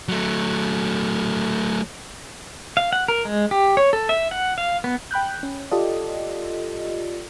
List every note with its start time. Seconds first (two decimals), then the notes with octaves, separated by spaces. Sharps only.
0.08 F#3 A3
2.77 F5
2.93 F#5
3.08 A#4
3.25 G#3
3.51 G4
3.77 C#5
3.93 A4
4.09 E5
4.31 F#5
4.58 F5
4.84 B3
5.11 G5 B5 F#6 G6
5.43 C#4
5.71 F4 G4 A4 D5 D#5